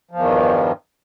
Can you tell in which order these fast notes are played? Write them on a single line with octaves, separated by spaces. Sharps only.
F3 E2 D#3 G2